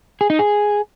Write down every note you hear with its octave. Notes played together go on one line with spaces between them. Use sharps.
G#4
D#4
G#4